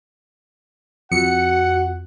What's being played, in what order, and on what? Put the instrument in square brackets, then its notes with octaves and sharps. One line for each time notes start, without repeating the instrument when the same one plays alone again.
[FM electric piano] F2 [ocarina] F#4 [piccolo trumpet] F#5 [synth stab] C#7